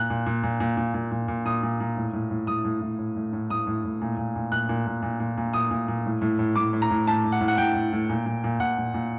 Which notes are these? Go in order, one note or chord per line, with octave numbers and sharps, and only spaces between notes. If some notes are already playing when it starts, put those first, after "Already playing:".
Already playing: A#2 F#6
A#2
A#2
A#2
A#2
A#2
A#2
A#2
A#2
A#2 D#6
A#2
A#2
A2
A2
A2
A2 D#6
A2
A2
A2
A2
A2
A2 D#6
A2
A2
A#2
A#2
A#2
A#2 F#6
A#2
A#2
A#2
A#2
A#2
A#2 D#6
A#2
A#2
A2
A2
A2
A2 D6
A2
A#5
A2
A2 A5
A2
F#5
A2
F#5
A2 G5
A2
A2
A#2
A#2
A#2
A#2 F#5
A#2
A#2